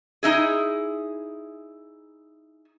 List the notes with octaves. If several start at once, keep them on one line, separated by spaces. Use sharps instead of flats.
D#4 E4 G#4